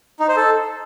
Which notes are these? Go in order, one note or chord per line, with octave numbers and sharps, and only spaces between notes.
D#4
C5
A4